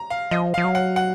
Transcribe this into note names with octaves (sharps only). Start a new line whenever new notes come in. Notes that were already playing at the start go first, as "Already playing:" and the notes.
Already playing: A#5
F5
F3 D#5
F5
F3
F#3
F#5
F#5